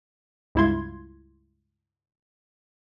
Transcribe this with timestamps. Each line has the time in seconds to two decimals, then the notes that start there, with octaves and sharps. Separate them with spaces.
0.55 C#2 G2 E4 F4 C6 G#6